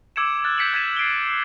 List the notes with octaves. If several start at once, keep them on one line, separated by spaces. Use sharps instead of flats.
D6 E6 G#6 C#7 D7 E7
F6 F#6 A6
G6 G#6 B6 C#7 D7 F#7
F#6 G#6 A6 B6 D#7 E7
C7 D7 F#7 G7